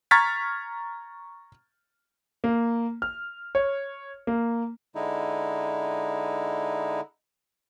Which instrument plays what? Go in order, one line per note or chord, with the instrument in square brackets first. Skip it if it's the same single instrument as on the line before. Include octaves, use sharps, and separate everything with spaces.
[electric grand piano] A#5 C#6 F6 G#6 A6 B6
[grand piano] A#3
F6
C#5
A#3
[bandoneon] D3 G#3 D#4 E4